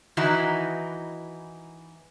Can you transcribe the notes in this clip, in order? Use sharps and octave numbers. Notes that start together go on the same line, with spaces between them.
D#3 E3 D#4 E4 F#4